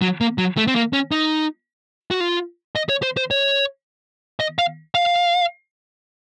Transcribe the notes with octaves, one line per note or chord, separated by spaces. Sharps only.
F#3
A#3
F#3
A3
C4
A#3
C#4
D#4
F#4
F4
D#5
C#5
C5
C5
C#5
D#5
F5
F5